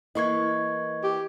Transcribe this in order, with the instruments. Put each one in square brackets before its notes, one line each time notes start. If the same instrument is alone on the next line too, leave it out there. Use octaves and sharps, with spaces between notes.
[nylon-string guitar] E3 A#3 E4 [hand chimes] D#5 C#6 G#6
[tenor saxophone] G4